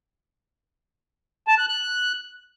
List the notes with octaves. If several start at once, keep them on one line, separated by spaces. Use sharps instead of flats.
A5
F#6
F#6